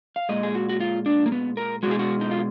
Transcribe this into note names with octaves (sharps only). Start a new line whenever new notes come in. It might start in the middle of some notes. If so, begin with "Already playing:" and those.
F5
A#2 G#3 D#5
G#4
F#4
F#4
F4
D4
A#3
B3
A#4
B2 G#3 F#4 G#4
F#4
D#4
F4